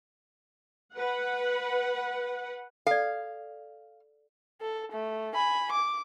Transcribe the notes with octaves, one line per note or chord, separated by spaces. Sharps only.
B4 F#5
A4 D5 F5
A4
A3
G#5 B5
D6